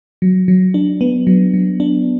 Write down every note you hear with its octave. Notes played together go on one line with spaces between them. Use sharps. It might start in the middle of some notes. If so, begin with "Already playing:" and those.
F#3
F#3
D4
B3
F#3
F#3
D4